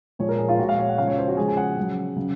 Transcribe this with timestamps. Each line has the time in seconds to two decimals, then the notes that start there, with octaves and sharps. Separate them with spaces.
0.19 A#2 F3 G#3 C#5
0.29 A#4
0.39 G#4
0.49 F4
0.58 A#2 F#4
0.63 G#3
0.69 F5
0.79 C#5
0.89 F#5
0.98 C#3 F3 G#3 F5
1.07 C#5
1.18 C5
1.28 F#4
1.37 C#3 F3 G#3 G#4
1.48 G#5
1.57 F#5
1.77 C#3 F#3
2.16 C#3 F#3